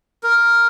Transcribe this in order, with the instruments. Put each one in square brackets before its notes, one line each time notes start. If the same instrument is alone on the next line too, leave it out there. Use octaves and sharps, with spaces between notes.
[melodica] A#4